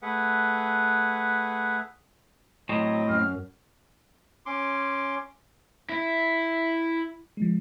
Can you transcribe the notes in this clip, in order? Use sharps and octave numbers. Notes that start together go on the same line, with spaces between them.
A3 G#4 B4 F#5
A2 F#3 C4 D#5
F#2 F6
C#4 C6 D6
E4
F3 G#3